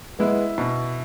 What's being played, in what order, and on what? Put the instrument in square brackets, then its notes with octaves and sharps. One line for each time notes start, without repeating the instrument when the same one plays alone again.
[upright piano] G#3 B3 [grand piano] E4
[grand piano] B2